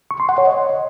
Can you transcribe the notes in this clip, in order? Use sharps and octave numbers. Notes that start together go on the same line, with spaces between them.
C#6
C6
F#5
C#5
D#5